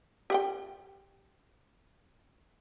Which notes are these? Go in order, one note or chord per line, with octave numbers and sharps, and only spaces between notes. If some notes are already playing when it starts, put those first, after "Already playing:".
G4 F#5 G5